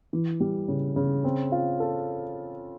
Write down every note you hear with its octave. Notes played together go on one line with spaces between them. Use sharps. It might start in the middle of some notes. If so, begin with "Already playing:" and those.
E3
G3
C#3
C#3
C4
F4
A4